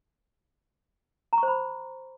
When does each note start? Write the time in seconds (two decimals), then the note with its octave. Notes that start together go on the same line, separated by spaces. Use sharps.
1.33 A#5
1.38 C#6
1.43 C5
1.48 B5